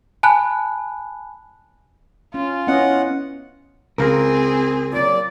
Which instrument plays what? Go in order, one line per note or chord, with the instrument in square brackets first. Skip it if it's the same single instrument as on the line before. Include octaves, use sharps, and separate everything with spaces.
[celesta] G#5 A5 B5 F#6
[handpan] C#4 [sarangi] F4
[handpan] B3 E4 D#5 [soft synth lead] C#4 [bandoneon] F#5
[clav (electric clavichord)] C#2 F5 A#5 [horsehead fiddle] C4 G#4 [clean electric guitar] A#4
[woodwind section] A#2 F#3 D5